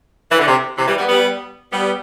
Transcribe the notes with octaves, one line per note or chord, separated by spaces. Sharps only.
E3
D3
C3
C3 E3
E3 G3
G3 B3
G3 B3
G3 B3